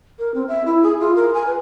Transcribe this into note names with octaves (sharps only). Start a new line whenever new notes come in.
A#4
C4
E5
E4
G#4
F4
A#4
G#5
B4